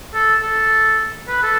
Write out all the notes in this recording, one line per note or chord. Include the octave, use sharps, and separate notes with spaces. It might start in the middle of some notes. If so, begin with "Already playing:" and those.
A4
A4
B4
A4